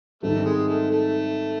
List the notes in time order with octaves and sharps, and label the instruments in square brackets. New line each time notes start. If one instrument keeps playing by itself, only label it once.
[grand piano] G#2 D#3 G3 C4 D#4 [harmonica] A3
[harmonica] G#3
A3
A3